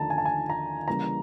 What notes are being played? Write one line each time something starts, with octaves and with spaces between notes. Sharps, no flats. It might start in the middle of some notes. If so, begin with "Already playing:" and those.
Already playing: D#2 D3 F3 A3 D4 A5 A#5
G#5
A5
G#5
A#5
C#3 E3 G3 A#3 A#5